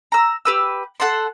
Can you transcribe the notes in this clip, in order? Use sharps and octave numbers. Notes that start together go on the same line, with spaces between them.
A#5 E6
G4 B4 E6
A4 F#5 A5 C6